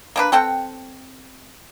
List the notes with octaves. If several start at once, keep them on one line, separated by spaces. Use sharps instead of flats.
A#3 D4 B4
C4 A4 F#5 G5